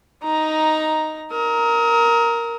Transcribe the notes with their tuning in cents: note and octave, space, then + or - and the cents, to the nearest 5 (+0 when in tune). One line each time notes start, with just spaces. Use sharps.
D#4 +0 A#5 +10
A#4 +0 D#6 +40